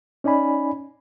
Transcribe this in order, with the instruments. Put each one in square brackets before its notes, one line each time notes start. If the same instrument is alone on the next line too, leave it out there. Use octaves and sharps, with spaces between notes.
[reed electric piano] C#4 D#4 D5 G#5 B5